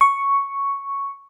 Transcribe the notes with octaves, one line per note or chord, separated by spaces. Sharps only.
C#6